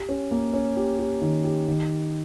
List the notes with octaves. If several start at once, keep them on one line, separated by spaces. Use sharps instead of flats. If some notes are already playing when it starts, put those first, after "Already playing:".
Already playing: G4
C#4
A#3
C#4
G4
G4
D#3
G4
D#3